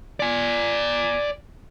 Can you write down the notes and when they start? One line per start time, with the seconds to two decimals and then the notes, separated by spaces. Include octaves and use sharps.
0.20 D5 G#5